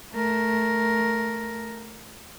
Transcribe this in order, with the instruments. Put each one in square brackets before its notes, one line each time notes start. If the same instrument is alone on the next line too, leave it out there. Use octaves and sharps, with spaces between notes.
[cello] A3 A#4